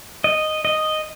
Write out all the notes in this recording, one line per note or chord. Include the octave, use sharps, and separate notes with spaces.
D#5
D#5